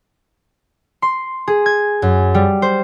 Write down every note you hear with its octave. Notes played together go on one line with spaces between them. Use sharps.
C6
G#4
G#6
F#2
G3
C5